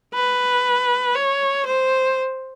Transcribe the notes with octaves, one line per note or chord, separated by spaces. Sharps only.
B4
C#5
C5